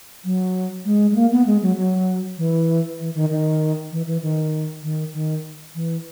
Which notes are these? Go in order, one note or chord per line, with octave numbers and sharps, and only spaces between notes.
F#3
G#3
G#3
A#3
B3
G#3
F#3
F#3
E3
E3
D#3
D#3
E3
E3
D#3
D#3
D#3
E3